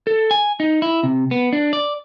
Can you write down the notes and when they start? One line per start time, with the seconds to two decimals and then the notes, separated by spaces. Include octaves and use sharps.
0.07 A4
0.31 G#5
0.60 D#4
0.82 E4
1.03 C3
1.31 B3
1.53 D4
1.73 D5